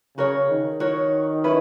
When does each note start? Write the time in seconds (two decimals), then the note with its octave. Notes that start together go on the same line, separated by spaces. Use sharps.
0.17 C#3 F#4 A#4 C#5
0.49 D#3
0.80 F#4 A#4 C#5
1.44 C#4 E4 B4